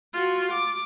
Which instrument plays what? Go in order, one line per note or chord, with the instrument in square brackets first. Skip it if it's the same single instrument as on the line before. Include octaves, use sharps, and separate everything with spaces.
[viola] F4 F#4
D6